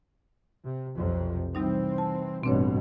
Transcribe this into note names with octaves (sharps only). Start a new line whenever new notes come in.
C3
B1 F2 C3
C3 E3 G3 C4 D#4
A5
A1 G2 B2 C4 D4 C#5